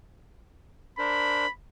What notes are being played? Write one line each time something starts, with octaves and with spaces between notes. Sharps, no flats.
D4 A#4 C5 B5